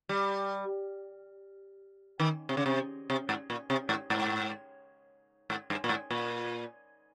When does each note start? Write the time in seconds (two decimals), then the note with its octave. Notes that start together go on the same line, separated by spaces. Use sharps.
0.09 G3
2.20 D#3
2.49 C3
2.57 C#3
2.66 C3
3.10 C3
3.29 G#2
3.50 A#2
3.70 C3
3.89 G#2
4.10 G#2
5.50 G#2
5.70 G2
5.84 A#2
5.89 G#2
6.11 A#2